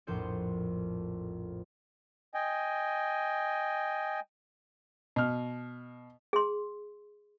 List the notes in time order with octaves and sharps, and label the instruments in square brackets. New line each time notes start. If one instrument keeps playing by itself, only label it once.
[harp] A#1 F2 A2 C5 G6 C#7
[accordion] D#5 G5 G#5
[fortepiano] B2 F6
[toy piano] G#4 C6